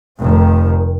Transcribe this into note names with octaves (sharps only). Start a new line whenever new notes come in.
F1 F2 D#3